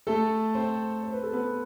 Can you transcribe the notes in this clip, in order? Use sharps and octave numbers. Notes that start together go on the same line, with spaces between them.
A3 A4
C4 C5
C5
B4
A4
B3 B4